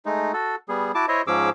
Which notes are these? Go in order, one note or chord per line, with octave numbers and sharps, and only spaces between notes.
G#3 A3 D#4
F#4 A4
G3 B3 G#4
E4 F#4 A5 D6
E4 C5 C#5 D#5 E5
G#2 F3 C#4 G#4 D6 E6